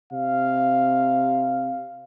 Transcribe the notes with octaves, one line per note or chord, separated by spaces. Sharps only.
C3 F5